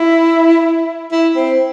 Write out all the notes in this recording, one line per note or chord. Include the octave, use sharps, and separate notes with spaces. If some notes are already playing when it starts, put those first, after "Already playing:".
Already playing: E4
E4
C4